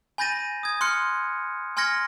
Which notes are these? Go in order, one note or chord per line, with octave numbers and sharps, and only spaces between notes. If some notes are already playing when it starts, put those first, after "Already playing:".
G#5 B5 G6 A6 A#6 D#7
D#6 G#6
C6 F6 F#6 C#7
G#5 C6 F6 G#6 A#6 C#7